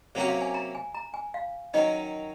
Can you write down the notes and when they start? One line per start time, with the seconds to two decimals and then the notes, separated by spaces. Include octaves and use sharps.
0.15 C3 F#3 A#3 C#4 F#4 C5
0.28 F5
0.42 G#5
0.54 A#5
0.75 G#5
0.94 A#5
1.14 G#5
1.34 F5
1.74 D#3 F#3 C#4 D#5